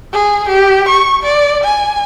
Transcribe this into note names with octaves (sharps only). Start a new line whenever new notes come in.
G#4
G4
C#6
D5
G#5